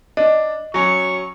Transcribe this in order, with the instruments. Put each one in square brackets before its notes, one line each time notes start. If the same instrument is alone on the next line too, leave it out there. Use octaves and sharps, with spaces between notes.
[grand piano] D4 [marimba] D#5
[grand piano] F#3 C#4 [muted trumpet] C#6